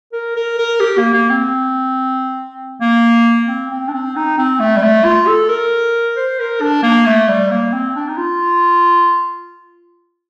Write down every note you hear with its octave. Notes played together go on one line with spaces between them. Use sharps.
A#4
A#4
A#4
G4
A#3
A#3
C4
A#3
C4
C4
D4
C4
D#4
C4
A3
G3
A3
F4
A4
A#4
C5
A#4
D4
A#3
A3
G3
A#3
C4
D4
D#4
F4